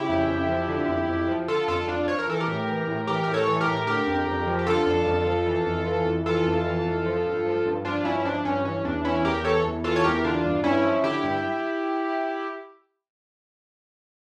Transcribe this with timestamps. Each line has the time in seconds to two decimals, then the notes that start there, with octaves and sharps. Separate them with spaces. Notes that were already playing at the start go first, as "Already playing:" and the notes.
Already playing: C#3 E4 G4
0.09 F2
0.29 F2
0.49 F3
0.68 D3
0.88 F2
1.08 F2
1.28 F3
1.48 D3 F4 A4
1.68 F2 F4 A4
1.88 F2 D4 F4
2.08 F3 C#5
2.19 A#4
2.28 E3 A4
2.40 G4 A#4
2.48 A2
2.68 E3
2.87 A2
3.07 E3 G4 A#4
3.24 A2 A#4
3.34 A4 C#5
3.48 E3
3.61 G4 A#4
3.67 A2
3.87 D3 G4 A#4
4.07 F2
4.27 F2
4.47 F3
4.59 G4
4.66 D3 F4 A4
4.86 F2
5.06 F2
5.27 F3
5.47 E3
5.66 F2
5.86 E3
6.06 F2
6.26 E3 F4 A4
6.46 F2
6.66 E3
6.86 F2
7.06 F3
7.26 G2
7.45 F3
7.66 G2
7.85 F3 D4 F4
8.05 G2 C#4 E4
8.20 E4
8.25 F3 D4
8.45 G2 C#4
8.65 E3 C#4
8.85 E2 D4
9.05 E3 C#4 E4
9.25 E2 G4 A#4
9.44 E3 A4 C#5
9.64 E2
9.84 E3 F4 A4
9.96 C#5
10.04 E2 G4 A#4
10.24 D3 D4 F4
10.44 G2
10.64 G2 C#4 E4
10.84 F3
11.04 D3 E4 G4
11.24 G2